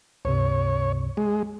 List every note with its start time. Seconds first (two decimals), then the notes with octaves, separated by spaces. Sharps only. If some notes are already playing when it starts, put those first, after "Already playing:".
0.25 C#2 G2 C3 C#5
1.17 G#3